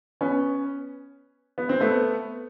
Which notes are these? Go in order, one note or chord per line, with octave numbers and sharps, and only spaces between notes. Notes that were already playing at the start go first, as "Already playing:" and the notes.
B3 C#4
B3
C4
A3 B3